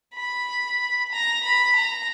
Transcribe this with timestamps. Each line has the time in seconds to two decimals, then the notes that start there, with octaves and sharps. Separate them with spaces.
0.15 B5
1.12 A#5
1.43 B5
1.75 A#5